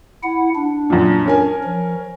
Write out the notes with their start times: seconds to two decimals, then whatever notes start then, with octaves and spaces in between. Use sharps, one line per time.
0.23 E4 F#5
0.55 D4
0.90 F#2 A#2
1.26 C#4 A#4 G#5
1.64 F3